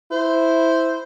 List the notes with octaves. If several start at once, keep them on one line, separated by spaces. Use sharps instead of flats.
E4 C5